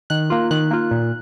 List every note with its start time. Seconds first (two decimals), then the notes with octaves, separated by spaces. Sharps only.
0.10 D#3 F#6
0.30 A#3 F4
0.51 D#3 F#6
0.71 A#3 F4
0.91 A#2